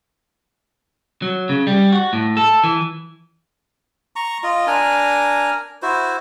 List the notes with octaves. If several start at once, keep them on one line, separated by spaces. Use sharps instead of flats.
F#3
C#3
G3
F#4
A2
A4
E3
A#5 C#6
F4 D#5
D4 A#4 G#5 A#5
E4 F#4 C5